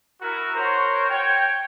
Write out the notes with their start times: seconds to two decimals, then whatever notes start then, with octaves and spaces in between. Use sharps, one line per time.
0.21 E4 F#4 A#4
0.55 F#4 A#4 C5 C#5
1.09 C#5 G5